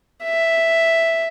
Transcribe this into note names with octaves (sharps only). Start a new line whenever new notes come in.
E5